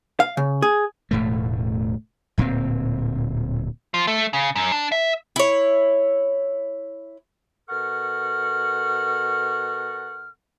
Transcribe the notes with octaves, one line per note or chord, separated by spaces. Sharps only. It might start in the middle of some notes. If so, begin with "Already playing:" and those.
F5
C#3
G#4
E1 A2 A3
D1 A#2 A#3 C4
F3
A3
C#3
F#2
D4
E5
E4 C#5
B2 A4 A#4 F#5 C#6 F6